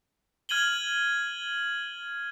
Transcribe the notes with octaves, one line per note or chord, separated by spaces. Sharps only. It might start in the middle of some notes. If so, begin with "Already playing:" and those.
F6 G#6 D#7 F#7 G7